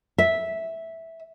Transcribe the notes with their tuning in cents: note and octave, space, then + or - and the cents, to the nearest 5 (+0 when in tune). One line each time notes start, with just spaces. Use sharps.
E5 -5